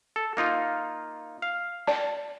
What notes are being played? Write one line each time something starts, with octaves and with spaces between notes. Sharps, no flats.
A4
A#3 D#4 F4
F5
D5 A5